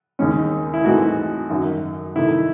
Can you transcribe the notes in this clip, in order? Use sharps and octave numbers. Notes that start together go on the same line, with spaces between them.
D#2 D#3 G#3 C#4
E4
A2 E3 G#3 C4 D#4 F#4
F#2 D#3 F#3
C3 D#3 A3 D#4 E4